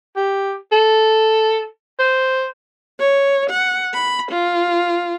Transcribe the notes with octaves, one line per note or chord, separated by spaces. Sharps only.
G4
A4
C5
C#5
F#5
B5
F4